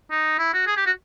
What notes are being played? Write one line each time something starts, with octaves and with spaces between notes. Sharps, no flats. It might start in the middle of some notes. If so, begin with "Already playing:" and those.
D#4
E4
F#4
G#4
G4
F#4